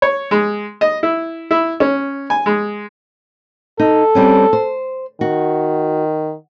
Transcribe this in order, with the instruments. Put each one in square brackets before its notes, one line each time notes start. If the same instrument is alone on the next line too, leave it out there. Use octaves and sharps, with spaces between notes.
[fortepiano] C#5
G#3
D#5
E4
E4
C#4
G#5
G#3
[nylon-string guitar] D#4 [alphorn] A4
[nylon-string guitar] G3 C4 C#4
C5
[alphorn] D#3 [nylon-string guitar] F#4